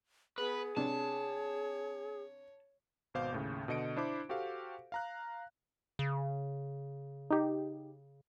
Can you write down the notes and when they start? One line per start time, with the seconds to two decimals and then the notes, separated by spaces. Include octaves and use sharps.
0.38 B3 G#4 B4
0.77 C3 D4 C#5 A5
3.14 G#1 B2 C5 F5 D6 G6
3.32 D#2 A2 C#3
3.68 B2 D3 D#5 C#7 D7
3.96 D4 E4 C5 B5 D6
4.29 F#4 G4 A4 C5 F5
4.92 F5 A#5 F#6
5.99 C#3
7.31 D#4 G4